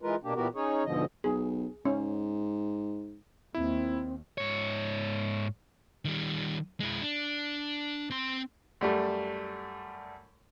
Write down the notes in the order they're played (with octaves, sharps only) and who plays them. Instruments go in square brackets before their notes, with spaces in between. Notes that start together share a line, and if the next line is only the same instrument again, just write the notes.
[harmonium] E3 G#3 F4 A#4 B4
B2 A#3 D4 G4
A#2 E3 B3 F#4 G4 A#4
C#4 D#4 G#4 C#5
D2 G#2 B2 D3 F3 D#5
[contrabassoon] B1 [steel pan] G#4
[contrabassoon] G#2 [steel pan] C#4
[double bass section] D#2 [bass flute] C4 [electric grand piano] E4
[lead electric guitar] G#2 C#5
[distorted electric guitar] D#3 G3
G#3 E4
D4
C4 C6
[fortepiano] F#2 G3 A3